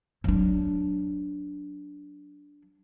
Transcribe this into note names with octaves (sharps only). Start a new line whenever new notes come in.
F#3 D4